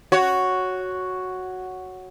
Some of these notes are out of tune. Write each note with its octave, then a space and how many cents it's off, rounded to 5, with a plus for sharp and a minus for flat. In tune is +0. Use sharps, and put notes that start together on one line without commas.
F#4 +0 C#5 +0